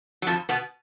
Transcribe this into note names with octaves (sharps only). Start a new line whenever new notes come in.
F#3
F2 F3
B2 B3